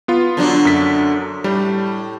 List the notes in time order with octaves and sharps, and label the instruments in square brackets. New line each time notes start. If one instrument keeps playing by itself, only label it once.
[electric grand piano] B3 F4
[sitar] D3 F#3 D4
[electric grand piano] F#2 B6
[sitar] A2 [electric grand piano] G3